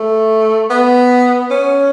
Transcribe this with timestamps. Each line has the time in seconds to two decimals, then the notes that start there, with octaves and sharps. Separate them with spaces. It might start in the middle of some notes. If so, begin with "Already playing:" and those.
Already playing: A3
0.70 B3
1.51 C#4